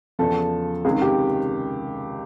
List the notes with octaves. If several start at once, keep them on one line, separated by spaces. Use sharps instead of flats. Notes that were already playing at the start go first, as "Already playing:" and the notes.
E2 C#3 F3 A4
C#2 C3 D#3 G#4
G4